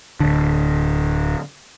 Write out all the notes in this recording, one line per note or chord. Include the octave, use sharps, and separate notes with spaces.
D1 D3